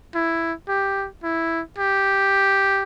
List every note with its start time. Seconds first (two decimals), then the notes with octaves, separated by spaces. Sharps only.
0.15 E4
0.69 G4
1.23 E4
1.78 G4